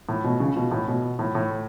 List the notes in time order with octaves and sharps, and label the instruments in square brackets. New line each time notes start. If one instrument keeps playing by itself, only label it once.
[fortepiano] A2
B2
C#3
B2
A2
B2
A2
A2